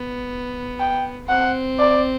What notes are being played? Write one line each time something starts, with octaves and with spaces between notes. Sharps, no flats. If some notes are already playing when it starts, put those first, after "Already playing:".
Already playing: B3
G5
C4 F#5
D5